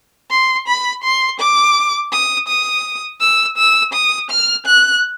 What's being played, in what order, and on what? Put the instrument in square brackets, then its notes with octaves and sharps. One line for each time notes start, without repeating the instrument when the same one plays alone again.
[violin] C6
B5
C6
D6
D#6
D#6
E6
E6
D#6
F6
F#6